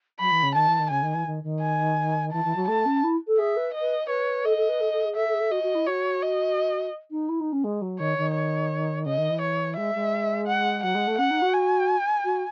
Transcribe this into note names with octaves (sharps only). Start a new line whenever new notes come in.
F#3 B5
E3
C#3
D#3 A5
E3
D#3
C#3 G#5
D#3
E3
D#3
D#3
G#5
E3 A5
E3
F#3
A3 A5
C#4
E4
A4
G#4 E5
B4
D#5
B4
B4 C#5
A4 D#5
A4
B4
A4
A4
G#4
A4 E5
A4
G#4
A4
F#4 D#5
F#4
E4
F#4 C#5
D#5
D#4
E4
D#4
C#4
G#3
F#3
D#3 C#5
D#3
C#5
C#3 D#5
D#3
E3
C#5
G#3 E5
G#3
F#5
F#3 F#5
G#3
A3
C#4 F#5
D#4
F#4
G#5
F#4